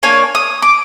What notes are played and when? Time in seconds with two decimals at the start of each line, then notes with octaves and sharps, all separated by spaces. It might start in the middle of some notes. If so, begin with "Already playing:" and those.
0.03 A#3 D4 C#5 G#5
0.35 D#6
0.62 D6